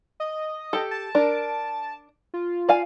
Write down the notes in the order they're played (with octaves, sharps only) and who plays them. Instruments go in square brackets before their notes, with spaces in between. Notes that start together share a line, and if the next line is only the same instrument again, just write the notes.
[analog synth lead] D#5
[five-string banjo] G4 A4
[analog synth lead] A5
[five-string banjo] D4 A#4
[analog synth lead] F4
[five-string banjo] D5 F5 G#5